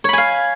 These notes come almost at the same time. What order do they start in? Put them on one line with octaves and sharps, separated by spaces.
C#5 B5 G#5 F5